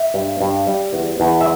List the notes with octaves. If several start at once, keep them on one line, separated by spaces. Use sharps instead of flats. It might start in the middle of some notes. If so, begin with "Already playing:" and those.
Already playing: E5
G2
G2
G3
E2
E2
E5